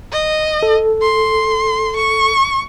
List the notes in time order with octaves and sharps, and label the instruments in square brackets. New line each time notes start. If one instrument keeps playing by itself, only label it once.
[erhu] D#5
[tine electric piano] A4
[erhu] C6
C#6